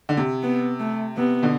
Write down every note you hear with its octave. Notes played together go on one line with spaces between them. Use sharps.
D3
C3
B3
A3
C3 B3
B2 D3